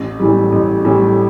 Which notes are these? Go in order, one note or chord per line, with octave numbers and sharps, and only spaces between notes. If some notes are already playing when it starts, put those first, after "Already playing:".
Already playing: A1
A2 E3 G3
A1
A2 E3 G3